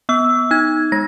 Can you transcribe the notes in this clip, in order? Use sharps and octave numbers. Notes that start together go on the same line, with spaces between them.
B3 E6
D#4 G#6
G#3 A#6